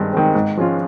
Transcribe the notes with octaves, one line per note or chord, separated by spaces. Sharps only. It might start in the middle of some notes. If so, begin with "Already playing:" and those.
Already playing: G2 D#3 G#3 C4
D#3 G#3 C4
G#2
F3 G#3 C#4 F4